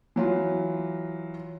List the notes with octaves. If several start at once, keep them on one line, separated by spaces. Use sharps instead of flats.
E3 F#3 F4